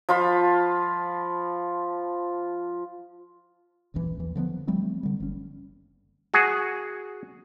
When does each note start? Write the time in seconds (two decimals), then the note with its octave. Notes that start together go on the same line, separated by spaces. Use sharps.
0.09 F3 F4 B5
3.94 D#1 A#1 F#2 E3
4.18 E2 E3
4.36 D3 F3 G3 B3
4.67 F3 G3 A3 C4
5.03 D3 G3
5.20 F#1 C#4
6.34 F#4 G#4